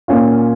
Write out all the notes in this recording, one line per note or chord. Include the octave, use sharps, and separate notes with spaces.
A#2 A#3 C#4 F4